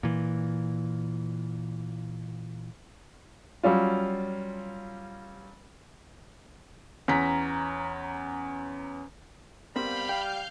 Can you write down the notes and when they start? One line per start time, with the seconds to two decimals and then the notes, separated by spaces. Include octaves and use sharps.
0.03 A#2 E3
3.63 F#3 G3 C#4 F4
7.08 E2 C#4 A#5 B6
9.76 G3 B3 C4 A#4 F5 B5 F6 G6
10.09 G5